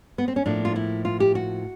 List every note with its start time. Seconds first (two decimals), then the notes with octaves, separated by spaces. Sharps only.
0.18 B3
0.28 C4
0.36 C#4
0.46 A2 F3 A#3 D4
0.65 F4
0.76 E4
1.05 F4
1.20 G4
1.35 F#4